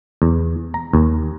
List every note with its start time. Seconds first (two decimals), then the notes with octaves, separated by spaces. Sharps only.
0.22 E2
0.74 A#5
0.93 D#2